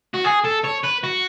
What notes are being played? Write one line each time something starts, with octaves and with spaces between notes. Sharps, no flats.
F#4
G#4
A4
C#5
B4
F#4